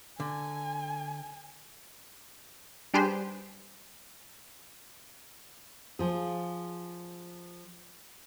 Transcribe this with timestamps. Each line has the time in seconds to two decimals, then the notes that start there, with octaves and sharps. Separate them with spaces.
0.20 D3 G#5
2.94 G3 D4 G4 G#4 B4 C5
5.99 F3 G#4